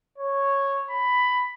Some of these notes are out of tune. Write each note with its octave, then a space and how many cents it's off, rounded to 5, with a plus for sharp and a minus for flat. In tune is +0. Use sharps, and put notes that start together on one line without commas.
C#5 -5
B5 +10